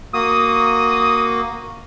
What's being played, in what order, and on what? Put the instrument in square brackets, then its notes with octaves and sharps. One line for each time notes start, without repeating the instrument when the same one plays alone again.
[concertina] A#3 F#4 [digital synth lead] D#6